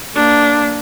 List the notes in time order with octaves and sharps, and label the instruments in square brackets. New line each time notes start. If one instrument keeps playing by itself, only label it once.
[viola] A#3 D4